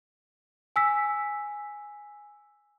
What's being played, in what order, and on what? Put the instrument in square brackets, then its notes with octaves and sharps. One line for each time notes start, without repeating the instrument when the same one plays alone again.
[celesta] G#5 E6 B6